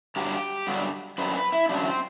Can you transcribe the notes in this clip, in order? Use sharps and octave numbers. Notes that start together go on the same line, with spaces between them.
G2 D3 F#3 B3 G4
G2 D3 F#3 B3
F#2 D3 F#3 C4 B4
B4
E4
F#2 D3 F#3 C4 D4
C4